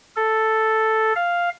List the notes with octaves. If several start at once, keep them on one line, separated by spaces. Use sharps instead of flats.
A4
F5